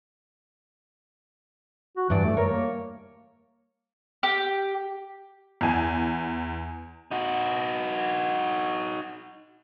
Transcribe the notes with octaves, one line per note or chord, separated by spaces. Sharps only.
F#4
G2 E3 D5
A3
A#4 C#5
A#3
G4
E2 G#5
D#4 F#4